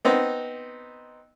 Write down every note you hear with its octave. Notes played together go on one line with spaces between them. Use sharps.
B3 C4 D#4